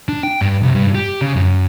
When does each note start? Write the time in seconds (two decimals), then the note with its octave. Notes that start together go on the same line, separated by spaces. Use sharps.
0.09 D4
0.23 G5
0.41 G2
0.63 C2
0.75 G2
0.95 G4
1.21 C#3
1.36 F#2